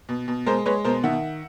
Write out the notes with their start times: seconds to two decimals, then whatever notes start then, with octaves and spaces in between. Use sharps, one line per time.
0.09 B2
0.28 B2
0.46 G#3 A#4 C5
0.66 G#3 B4 C#5
0.85 B2 A#4 C5
1.04 D#3 E5 F#5